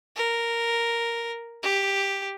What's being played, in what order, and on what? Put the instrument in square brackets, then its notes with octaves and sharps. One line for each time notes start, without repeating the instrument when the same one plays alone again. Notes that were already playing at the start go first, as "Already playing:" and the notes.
[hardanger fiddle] A#4
G4